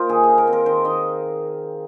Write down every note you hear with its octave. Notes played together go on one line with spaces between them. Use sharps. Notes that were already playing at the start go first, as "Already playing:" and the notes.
Already playing: A#3 D#4 F4 A#4 C5
D#3 G#4
G#4
D#4
A#4
C4
A#4
D#3 C5
D#3 D#5